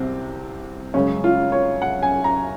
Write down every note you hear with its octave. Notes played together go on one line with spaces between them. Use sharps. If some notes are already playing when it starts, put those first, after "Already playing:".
Already playing: C2 C3 C4
F#2 C#3 G#3 C#4
F4
C#5
F#5
G#5
A#5